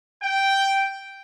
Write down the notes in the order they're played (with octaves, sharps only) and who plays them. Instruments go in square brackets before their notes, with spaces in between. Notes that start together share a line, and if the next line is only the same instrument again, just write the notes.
[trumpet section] G5